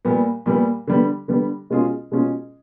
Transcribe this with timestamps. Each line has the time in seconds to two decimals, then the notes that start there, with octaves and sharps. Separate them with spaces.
0.05 A#2 G3 B3
0.46 A#2 G3 B3
0.87 D3 G3 B3
1.28 D3 G3 B3
1.70 B2 G#3 C#4 F4 G#4
2.11 B2 G#3 C#4 F4 G#4